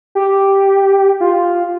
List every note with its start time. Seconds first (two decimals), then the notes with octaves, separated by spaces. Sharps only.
0.15 G4
1.21 F4